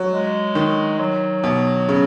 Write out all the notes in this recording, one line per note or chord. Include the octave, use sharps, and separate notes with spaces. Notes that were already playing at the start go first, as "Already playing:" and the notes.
Already playing: F#3
G#3
D#3
F#3
B2
C#3